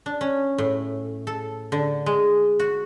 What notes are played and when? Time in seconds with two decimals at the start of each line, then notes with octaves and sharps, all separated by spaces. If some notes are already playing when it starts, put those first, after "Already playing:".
0.06 D4
0.21 C#4
0.58 A2
1.27 A4
1.72 D3
2.06 G#3
2.59 F#4